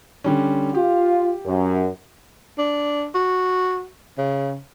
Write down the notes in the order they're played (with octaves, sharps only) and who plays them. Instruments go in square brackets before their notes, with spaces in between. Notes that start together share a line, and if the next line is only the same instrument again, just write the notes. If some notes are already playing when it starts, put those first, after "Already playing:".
[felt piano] D3 G3 C#4
[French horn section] F4 [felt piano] G4
[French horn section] F#2
[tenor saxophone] D4
F#4
C#3